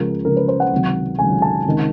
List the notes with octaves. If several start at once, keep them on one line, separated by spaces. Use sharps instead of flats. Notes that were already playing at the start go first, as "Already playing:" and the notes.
Already playing: C#2 C#3 F3 A#4
C#2 C#3 F3 A#4
B4
C5
F#5
C#2 C3 D#3 F#3
C#2 C3 D#3 F#3 G#5
A5
C#2 C3 D#3